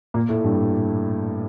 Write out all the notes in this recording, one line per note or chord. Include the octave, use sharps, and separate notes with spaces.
A#2 A#3
A2 A3
G2 G3